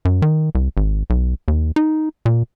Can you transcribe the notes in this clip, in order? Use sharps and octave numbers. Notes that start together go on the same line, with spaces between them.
F#2
D#3
C2
G#1
B1
D#2
D#4
A#2